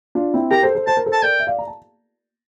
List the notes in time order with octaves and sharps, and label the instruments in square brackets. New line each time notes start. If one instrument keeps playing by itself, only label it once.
[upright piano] D4 F4
C4 E4
[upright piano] G4 A#4 [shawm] A#5
[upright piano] A4 C5
A4 C5
[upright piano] C5 [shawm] A5
[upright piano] A#4
A4 C5
[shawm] A5
[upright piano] A#4 D5 [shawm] G5
[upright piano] E5
D5 F5
A#5
A5